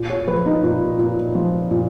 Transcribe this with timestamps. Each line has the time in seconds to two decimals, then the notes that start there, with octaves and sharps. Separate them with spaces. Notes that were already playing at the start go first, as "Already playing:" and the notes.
Already playing: A#2
0.10 C#5
0.27 F3 B4
0.46 D#4
0.63 A#2
0.98 A#2
1.35 F3
1.71 A#2